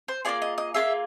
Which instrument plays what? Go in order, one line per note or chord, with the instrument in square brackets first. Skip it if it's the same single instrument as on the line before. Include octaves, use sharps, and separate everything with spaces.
[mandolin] C5
A#3 C#4 F4 G#4 D5
D#5
D#5
A#3 C#4 F4 G#4 E5